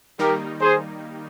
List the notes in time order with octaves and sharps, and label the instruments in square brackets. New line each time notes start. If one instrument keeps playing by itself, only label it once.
[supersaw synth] D#3 G3 A#3 D#4 [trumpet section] G4 A#4
[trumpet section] G#4 C5